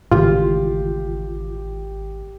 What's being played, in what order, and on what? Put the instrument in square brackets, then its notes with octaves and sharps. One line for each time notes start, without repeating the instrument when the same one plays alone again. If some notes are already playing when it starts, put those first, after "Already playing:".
[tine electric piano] G#1 [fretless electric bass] A2 C#3 E3 [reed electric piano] F4 [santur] G4